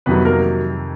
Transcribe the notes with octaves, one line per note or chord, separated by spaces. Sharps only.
F2 C3 D#3 F#3 B3 B4
A#3 A#4